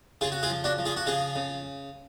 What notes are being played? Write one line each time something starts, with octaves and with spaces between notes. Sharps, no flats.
C#3 F4 G#4
F#4
F4 G#4
F3
D4 F#4
F3
F4 G#4
F#4
C#3 F4 G#4
C#3